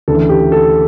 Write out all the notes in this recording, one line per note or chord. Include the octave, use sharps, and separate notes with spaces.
D2 C#3 E3 A4
G4
A4